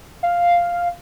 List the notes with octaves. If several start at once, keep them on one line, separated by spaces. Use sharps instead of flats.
F5